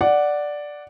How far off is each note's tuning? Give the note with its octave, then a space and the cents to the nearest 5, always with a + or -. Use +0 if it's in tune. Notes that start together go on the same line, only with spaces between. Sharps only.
D5 +0 F#5 +0